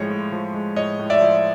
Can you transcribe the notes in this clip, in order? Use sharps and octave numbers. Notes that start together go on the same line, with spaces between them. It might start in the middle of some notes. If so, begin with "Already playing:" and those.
Already playing: A2 F3 G#3 C#5
A2
F3
G#3
A2 C#5 D#5
A2
D5 E5
F3